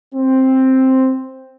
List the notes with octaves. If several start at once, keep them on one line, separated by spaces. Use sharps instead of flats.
C4